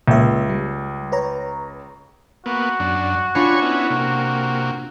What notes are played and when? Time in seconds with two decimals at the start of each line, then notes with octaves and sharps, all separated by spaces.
0.08 C#2 A#3 E5
0.50 G3
1.12 B4 C#5 A#5
2.46 A#3 B3 F#4
2.80 F#2 D4
3.35 D4 F4 C#5 G#5 B5 C#6
3.62 B3 C#4 E4
3.90 C3 A#3